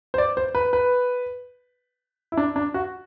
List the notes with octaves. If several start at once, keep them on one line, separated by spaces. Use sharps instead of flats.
C5
D5
C5
B4
B4
E4
D4
D4
F#4